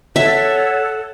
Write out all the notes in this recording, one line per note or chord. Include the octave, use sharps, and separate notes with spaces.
A4 C#5 E5 F#5